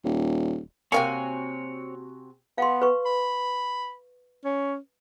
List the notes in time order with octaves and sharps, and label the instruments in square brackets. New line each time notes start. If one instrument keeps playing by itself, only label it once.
[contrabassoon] D#1
[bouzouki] C3 F#4 G#5 [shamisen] A#3 F5 G5 [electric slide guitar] C4 C#5
[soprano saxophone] B3 [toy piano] F5 C6
[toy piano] B4 C#6
[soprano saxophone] B5
C#4